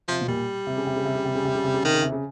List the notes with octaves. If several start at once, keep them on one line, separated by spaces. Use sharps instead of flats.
C3 F3
B2
A#2 G3
C3
C#3
C3
C#3
C3
C#3
C3
C#3
C3
C#3
C3
C#3
C3 D#3
C#3
C3
C#3